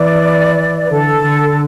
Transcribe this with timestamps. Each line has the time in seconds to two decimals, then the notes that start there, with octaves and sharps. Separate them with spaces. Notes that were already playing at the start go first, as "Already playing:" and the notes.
Already playing: E3 D5
0.85 B4
0.91 D3 A4
1.24 D3